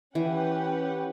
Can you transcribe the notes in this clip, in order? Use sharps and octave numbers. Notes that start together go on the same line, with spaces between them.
E3 C#4 G4 B4 F#5